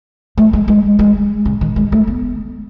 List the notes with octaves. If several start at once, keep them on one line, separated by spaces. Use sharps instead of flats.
A3
G#3
G#3
G#3
C#3
D#3
G#3
A3
B3